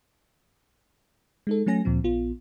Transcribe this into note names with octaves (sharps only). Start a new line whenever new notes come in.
G#3 D#4 A4
F#3 A3 C#4 G#5 A#6
D2 A#2 F3 C4
A#1 B3 F4